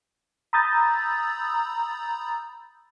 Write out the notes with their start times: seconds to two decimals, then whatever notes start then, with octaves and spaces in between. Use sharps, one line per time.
0.53 A#5 B5 D#6 E6 G6 A6